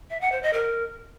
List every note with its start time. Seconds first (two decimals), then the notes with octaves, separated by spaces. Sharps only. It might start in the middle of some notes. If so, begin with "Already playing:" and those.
0.10 E5
0.21 F#5
0.32 C5
0.43 D#5
0.53 A#4